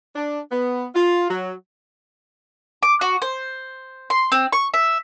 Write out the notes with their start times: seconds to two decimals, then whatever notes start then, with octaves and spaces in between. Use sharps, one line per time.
0.16 D4
0.51 B3
0.95 F4
1.29 F#3
2.83 D6
3.01 F#4
3.22 C5
4.10 C6
4.32 C4
4.53 C#6
4.74 E5